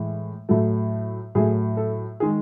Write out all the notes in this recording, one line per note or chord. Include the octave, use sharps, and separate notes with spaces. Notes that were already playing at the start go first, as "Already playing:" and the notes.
Already playing: A2 E3 G#3
A2 F#3 A3
A2 F#3 A3 G#4
A4
D#3 G#3 G#4